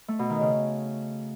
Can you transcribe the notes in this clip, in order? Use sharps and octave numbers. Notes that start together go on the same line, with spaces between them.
A3
B2
D#3
C#3